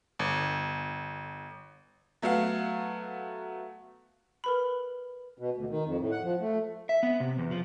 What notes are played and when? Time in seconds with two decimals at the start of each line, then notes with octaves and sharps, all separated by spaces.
0.19 G1
2.22 F#3 A3 B3 F5 F#5
4.44 A#4 B4 B5
5.38 B2
5.57 D2
5.70 D#3
5.86 F2
6.00 A2
6.11 F#5
6.24 F3
6.41 A3
6.89 E5
7.03 B3
7.20 C3
7.39 E2
7.51 F3